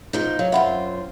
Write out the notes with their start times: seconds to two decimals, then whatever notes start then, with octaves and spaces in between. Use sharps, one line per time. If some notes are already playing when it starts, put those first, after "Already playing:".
0.13 B2 F3 D#4
0.39 F#3 F5
0.52 F#2 C4 F4 E5 F#5 B5